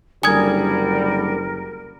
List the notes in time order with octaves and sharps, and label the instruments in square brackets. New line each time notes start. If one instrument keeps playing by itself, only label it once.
[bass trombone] F#1 [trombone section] D3 G3 [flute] A#4 [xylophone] G#5 D#6 G#6